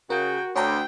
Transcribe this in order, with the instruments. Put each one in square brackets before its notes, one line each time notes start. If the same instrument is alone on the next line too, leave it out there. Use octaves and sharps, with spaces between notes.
[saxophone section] C#3 [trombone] F#4 [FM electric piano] A#4 [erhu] G5
[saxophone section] D2 [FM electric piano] C#5 G#5 A#5 [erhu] G5